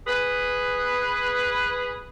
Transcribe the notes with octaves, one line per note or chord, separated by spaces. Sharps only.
G#4 B4